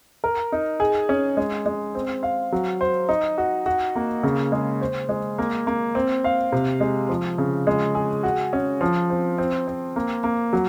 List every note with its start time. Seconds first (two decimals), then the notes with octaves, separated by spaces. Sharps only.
0.24 A#4
0.52 D#4
0.80 G#4
1.09 C#4
1.37 G#3
1.66 G#3
1.95 C4
2.23 F5
2.52 F#3
2.81 C5
3.09 D#4
3.38 F#4
3.66 F#4
3.96 A#3
4.23 C#3
4.52 G#3
4.81 C5
5.09 G#3
5.38 A#3
5.67 A#3
5.95 C4
6.24 F5
6.52 C3
6.80 G#3
7.09 F3
7.38 C#3
7.67 G#3
7.95 G#4
8.23 F#4
8.53 C#4
8.81 F3
9.10 C4
9.38 C4
9.68 C4
9.96 A#3
10.24 A#3
10.53 F#3